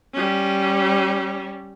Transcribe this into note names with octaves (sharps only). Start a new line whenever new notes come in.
G3 C#4